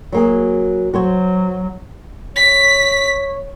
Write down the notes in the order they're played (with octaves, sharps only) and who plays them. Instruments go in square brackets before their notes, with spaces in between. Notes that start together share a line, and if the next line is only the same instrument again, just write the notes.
[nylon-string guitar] F#3 A#3 G#4
[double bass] F#3 [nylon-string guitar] F#4 C5 C#5
[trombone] C#5 [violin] B6